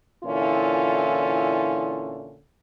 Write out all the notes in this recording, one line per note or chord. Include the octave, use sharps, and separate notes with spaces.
A#2 D3 E3 C#4 E4 F4